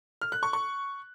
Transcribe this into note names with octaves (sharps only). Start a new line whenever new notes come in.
F6
F#6
C#6
C#6